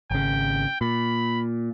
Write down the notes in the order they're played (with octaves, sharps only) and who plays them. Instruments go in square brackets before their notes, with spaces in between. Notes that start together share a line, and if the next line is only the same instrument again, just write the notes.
[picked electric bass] G#1 C#3 [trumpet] G5
[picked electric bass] A#2 [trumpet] B5